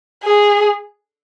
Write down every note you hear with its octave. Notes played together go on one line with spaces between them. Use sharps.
G#4